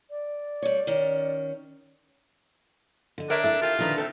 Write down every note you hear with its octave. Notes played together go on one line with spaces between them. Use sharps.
D5
G3 C#5
D#3 C#4
D3 D#5
D4 A#4 C#5 E5
E4 A4 A#4 E5
F4 G4 A4
A#2 D3 D#3 D4 B4
A3 C4 A4